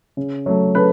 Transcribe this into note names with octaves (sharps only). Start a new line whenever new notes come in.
C#3
F#3 A3
C#3 A4 B4